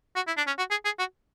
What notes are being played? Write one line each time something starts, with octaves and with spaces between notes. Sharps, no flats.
F#4
E4
D4
C#4
F#4
G#4
G#4
F#4